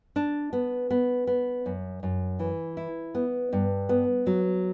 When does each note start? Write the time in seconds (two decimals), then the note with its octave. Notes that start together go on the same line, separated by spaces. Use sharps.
0.16 D4
0.53 B3
0.91 B3
1.27 B3
1.66 F#2
2.03 F#2
2.39 E3
2.77 E4
3.15 B3
3.53 G2
3.89 B3
4.27 F#3